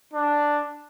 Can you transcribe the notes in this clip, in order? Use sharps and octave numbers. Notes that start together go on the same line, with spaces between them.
D4